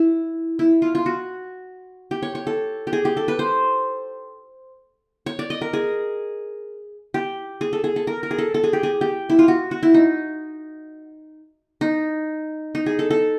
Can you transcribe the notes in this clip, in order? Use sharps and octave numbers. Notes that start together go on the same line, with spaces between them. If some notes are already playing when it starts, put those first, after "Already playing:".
Already playing: E4
E4
F4
F4
F#4
G4
C#5
C#5
A4
G4
G#4
G4
A4
B4
C5
C#5
D5
D#5
A#4
G#4
G4
G#4
A4
G#4
A4
A#4
A#4
G#4
A4
A4
G#4
G4
G#4
G4
E4
F4
F#4
F#4
E4
D#4
D#4
D#4
G#4
A4
A4